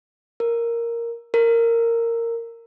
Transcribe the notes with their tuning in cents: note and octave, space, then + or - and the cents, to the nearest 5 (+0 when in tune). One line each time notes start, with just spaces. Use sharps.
A#4 +0
A#4 -15